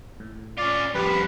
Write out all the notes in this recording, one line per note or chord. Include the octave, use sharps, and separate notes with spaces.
A2
C#4 F4 D5
C2 F2 F3 G4 B4 B6